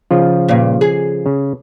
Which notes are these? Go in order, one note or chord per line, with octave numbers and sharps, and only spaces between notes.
C#3 F3 F4
G2 A#2
G#4
C#3